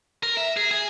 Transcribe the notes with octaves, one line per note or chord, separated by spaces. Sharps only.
A#4
E5
G#4
G#4